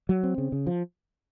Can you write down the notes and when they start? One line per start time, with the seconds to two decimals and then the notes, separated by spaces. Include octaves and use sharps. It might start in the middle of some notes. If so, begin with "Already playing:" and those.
0.09 F#3
0.23 C4
0.38 C#3
0.52 C#3
0.67 F3